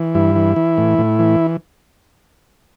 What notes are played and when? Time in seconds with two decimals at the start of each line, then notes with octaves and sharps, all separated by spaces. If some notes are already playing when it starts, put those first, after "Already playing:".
Already playing: E3
0.15 G2 E4
0.35 E3
0.56 E3
0.78 A2
0.98 A2
1.19 E3